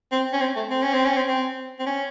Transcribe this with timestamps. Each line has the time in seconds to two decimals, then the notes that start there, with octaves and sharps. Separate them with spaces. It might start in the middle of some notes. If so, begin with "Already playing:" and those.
0.12 C4
0.33 C#4
0.41 C4
0.56 A3
0.70 C4
0.82 C#4
0.93 C4
1.05 C#4
1.17 C4
1.28 C4
1.79 C4
1.86 C#4